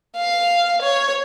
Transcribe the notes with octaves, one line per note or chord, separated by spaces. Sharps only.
F5
C#5